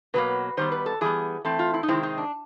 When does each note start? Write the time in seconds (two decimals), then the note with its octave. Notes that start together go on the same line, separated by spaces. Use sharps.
0.14 B2 F#3 A#3 B4
0.57 D#3 G3 B3 C5
0.72 B4
0.86 A4
1.01 E3 G3 B3 G#4
1.45 E3 A3 C4
1.59 F4
1.74 E4
1.83 D#4
1.88 C3 D#3 G#3 C4 E4
2.03 D#4
2.18 D4